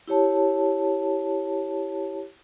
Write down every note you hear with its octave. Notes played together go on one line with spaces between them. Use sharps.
E4 G4 C#5 A5